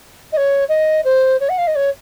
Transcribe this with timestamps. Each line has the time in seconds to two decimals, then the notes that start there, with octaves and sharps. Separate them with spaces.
0.32 D#5
0.37 C#5
0.69 D#5
1.05 C5
1.40 C#5
1.49 F#5
1.58 F5
1.67 D#5
1.76 C#5